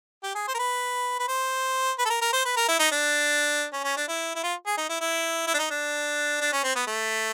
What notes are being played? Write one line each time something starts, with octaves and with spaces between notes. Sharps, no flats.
G4
G#4
C5
A#4
B4
B4
C5
B4
A4
A#4
A#4
C5
B4
A#4
E4
D#4
D4
C#4
C#4
D4
E4
E4
F4
G#4
D#4
E4
E4
E4
D4
D#4
D4
D4
C#4
C4
B3
A3